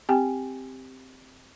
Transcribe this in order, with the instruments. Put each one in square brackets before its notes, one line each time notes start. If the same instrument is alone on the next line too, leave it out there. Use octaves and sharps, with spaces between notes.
[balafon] C4 G4 G5 G#5